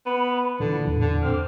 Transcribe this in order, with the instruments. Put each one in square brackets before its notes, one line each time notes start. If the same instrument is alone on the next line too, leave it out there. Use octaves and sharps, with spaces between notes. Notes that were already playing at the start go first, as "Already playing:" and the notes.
[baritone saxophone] B3 [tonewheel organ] B5
[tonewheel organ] A#2 E3 [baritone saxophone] D3
[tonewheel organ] E2 A2
[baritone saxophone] D3
[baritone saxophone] C4 [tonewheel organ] D6 F6